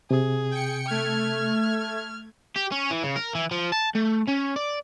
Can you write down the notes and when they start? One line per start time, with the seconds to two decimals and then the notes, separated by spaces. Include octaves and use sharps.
0.11 C3 G#4
0.51 G5 C#7
0.87 A3 F6 G#6
2.56 G4
2.72 C#4
2.91 E3
3.03 C#3
3.16 A#4
3.35 E3
3.51 F3
3.72 A5
3.95 A3
4.28 C#4
4.56 D5